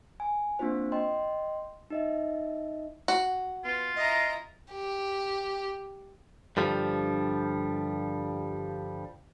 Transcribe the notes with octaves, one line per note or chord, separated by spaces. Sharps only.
G#5
A#3 C4 D4 F4 C5
D#5 G5 C6
D#4 D#5 E5
F#4
B3 F4
E4 D#5 A#5
G4
G2 D3 F3 G3